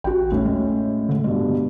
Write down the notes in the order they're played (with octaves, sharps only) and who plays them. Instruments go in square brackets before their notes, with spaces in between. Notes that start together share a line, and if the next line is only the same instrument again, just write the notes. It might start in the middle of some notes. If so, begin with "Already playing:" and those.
[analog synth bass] A1 [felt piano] F#4 G5
[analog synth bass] D#2 [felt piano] A2 C#4
[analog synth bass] G#3
D3
[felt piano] G2 B2 [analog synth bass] G#3